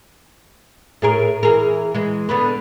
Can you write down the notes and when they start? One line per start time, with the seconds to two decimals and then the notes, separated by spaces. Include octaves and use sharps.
1.02 A2 G#4 A#4
1.43 E3 G#4 A#4
1.94 E3 G#3
2.29 D3 B3 B4